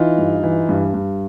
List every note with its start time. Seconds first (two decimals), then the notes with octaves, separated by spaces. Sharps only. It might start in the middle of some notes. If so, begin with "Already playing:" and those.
Already playing: E3 D#4 F4
0.18 G2
0.43 E3
0.69 G2
0.94 G2